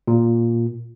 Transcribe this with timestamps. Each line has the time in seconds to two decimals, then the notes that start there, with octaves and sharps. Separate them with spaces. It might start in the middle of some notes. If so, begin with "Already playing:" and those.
0.07 A#2